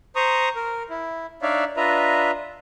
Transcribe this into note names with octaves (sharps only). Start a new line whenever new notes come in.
C5 A#5 C#6 D#6
A#4
E4
D4 D#4 C#5 D5 E5 F5
D4 F4 B4 D#5 E5 A#5